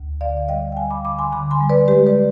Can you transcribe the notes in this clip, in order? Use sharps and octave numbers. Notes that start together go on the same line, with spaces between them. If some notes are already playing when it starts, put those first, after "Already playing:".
Already playing: D2
D3 D5 F5
G3 D#5 G5
G5
G3 F5 G#5
B5 D6
D3 B5 D6
G#5 C6
D3 B5 D6
G#5 C6
G3
B4 D5
G#3 G4 B4
B4 D5